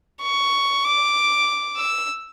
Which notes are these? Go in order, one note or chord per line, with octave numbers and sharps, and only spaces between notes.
C#6
D6
E6